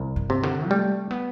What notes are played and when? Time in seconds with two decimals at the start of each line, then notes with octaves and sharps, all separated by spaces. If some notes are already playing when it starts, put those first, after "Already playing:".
Already playing: C2
0.16 G2
0.30 C3
0.43 D3
0.71 G3 A3
1.11 B3